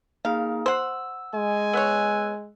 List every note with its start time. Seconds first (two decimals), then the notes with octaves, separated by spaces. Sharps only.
0.25 A#3 D#4 G#4 F5
0.66 C5 F#5 E6
1.35 G#3 G#5
1.73 B3 C#5 E6 F#6